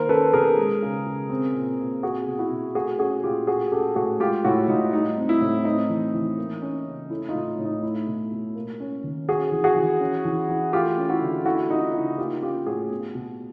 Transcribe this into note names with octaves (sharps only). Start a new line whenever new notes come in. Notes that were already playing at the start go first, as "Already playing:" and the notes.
Already playing: D#3 A#3 A#4 C5
C#4 A4 B4
B2 G#4 A#4
G#3
C#3
C#3
C4
A#2
A#2
C4 F#4 G#4
B2
E4 F#4
B2
A3 F#4 G#4
C#4 F#4 G#4
A#2 F4 G4
A3 F#4 G#4
C#4 G4 A4
A2 F#4 G#4
G#3 F4 G4
A2 E4 F#4
A2 D#4 F4
G3 D#4
C4
E4
A2
C4 D#4
E3
E3
A#3
C#4
C#3
A3 E4
D#4 F4
A2
A2
D#4
A3 E4
B2
B2
A#3
C#4
D#3
C#4 F#4 G#4
E3
F#4 G#4
E3
C#4
E3
E3
A3 F4 G4
C#4
E4 F#4
D3
A3 E4 F#4
C#4 D#4 F4
C#3 E4 F#4
A#3 F4 G4
C#4 F4 G4
A2 F#4 G#4
B3
B2